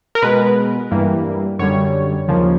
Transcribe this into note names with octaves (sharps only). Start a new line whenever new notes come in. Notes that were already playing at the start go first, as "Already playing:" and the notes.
A#4
B2 G#3 B3 B4
G2 E3 G3 A#3
F#2 D3 G3 C#5
D#2 C#3 F3 A#3